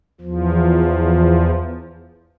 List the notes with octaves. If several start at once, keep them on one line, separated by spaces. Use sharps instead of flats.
E2 F3